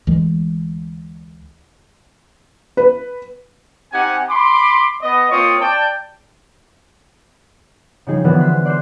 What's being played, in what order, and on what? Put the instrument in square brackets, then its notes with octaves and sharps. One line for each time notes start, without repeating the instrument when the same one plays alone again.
[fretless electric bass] D2 E3 G#3
[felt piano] B4
[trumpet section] C4 D#4 G4 F#5 G#5
B5 C6 D6
B3 D#5
A#3 C4 F4 C#5 C#6 D#6
D5 G5 A5
[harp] C#3 F3 G3 D#4 G#4
D3 E3 F3 B3 F#4 B4
C5 F#6 B6
D5 C6 F#6 G6 C7 E7